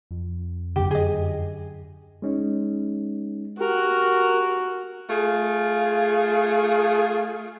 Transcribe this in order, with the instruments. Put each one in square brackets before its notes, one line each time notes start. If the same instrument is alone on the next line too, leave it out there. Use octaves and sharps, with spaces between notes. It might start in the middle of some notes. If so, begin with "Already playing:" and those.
[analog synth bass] F2
[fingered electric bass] F#2 D3 [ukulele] G4
[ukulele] G#4 D#5
[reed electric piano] G#3 C#4 D#4
[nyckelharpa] F#4 [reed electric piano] G4 [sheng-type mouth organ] A#4
[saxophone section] A3 F4 G#4